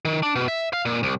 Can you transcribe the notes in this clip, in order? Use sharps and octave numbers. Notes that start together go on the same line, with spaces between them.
D#3
D4
B2
E5
F5
A#2
C2